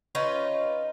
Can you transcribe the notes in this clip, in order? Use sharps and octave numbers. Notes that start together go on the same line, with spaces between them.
C#4 D#4 F4 B4